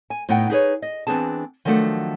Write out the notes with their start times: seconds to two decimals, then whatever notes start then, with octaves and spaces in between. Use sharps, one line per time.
0.10 G#5
0.29 A2 B3 D#4 F#5 G5
0.50 D#4 G#4 B4 C#5
0.82 D#5
1.07 E3 B3 C4 D4 G#4 A5
1.65 D#3 F3 F#3 A3 D4 F#5